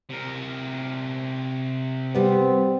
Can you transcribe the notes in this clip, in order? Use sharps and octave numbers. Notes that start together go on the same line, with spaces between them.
C3 A#4
G3 B3 C4